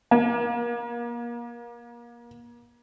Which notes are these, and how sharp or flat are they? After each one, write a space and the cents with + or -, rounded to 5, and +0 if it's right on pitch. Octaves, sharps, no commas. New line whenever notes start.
A#3 +40